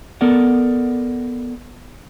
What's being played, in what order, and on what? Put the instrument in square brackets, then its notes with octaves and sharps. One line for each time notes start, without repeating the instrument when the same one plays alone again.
[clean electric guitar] B3 A4 A#4 D5 F#5